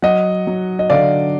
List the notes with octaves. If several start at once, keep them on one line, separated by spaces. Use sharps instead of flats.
F#3 D#5 F#5
F#3
D#5
D3 D5 F5